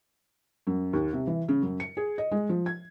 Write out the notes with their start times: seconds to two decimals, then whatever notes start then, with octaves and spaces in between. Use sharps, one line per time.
0.67 F#2
0.93 D#2
1.13 C3
1.27 E3
1.48 C#3
1.62 F#2
1.80 C#7
1.97 G#4
2.18 D#5
2.31 G#3
2.49 F3
2.66 G#6